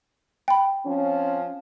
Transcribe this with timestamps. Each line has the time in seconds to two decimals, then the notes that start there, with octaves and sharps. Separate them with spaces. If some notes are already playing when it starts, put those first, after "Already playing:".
0.48 G5 B5
0.86 F3 C4 C#4